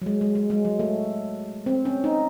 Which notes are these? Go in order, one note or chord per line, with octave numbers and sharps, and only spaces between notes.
F#3
G#3
G#3
G#3
G#3
F#3
A3
C4
C#4
D#4